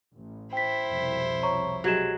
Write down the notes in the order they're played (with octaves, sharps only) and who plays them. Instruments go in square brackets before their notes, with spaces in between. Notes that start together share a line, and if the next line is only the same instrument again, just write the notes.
[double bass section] A1
[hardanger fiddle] E4 C5 [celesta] G5 B6
[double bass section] C2 F2 B2
[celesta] C#5 A#5 C#6
[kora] F#3 G#3 [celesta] G4 G#6 E7